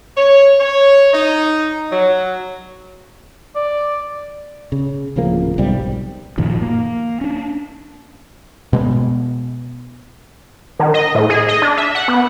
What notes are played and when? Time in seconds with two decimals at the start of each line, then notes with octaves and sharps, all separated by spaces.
0.17 C#5
0.59 C#5
1.14 D#4
1.92 F#3
3.56 D5
4.72 C#3
5.16 D1 C#3 F3 A#3
5.58 B1 G#2 C3 G3
6.38 F#2 A#2 D#3 F3
6.61 A#3
7.21 C#4 D4
8.73 B2 G#3 B3
10.79 D#3
10.94 D#5
11.15 A2
11.30 G#4
11.48 D#5
11.62 D4
11.77 E5
11.95 F#5
12.08 B3